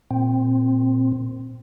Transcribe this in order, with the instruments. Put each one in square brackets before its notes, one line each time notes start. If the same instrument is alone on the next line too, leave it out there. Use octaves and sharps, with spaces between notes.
[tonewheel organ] A#2 C4